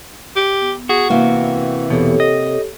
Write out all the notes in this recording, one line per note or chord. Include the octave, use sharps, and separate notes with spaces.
G4
B3
F#4 G#4
C3 E3 A#3
E2 B2 G4 A4 C#5
D#5